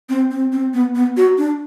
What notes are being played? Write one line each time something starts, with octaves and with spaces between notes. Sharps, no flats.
C4
C4
C4
B3
B3
F#4
D4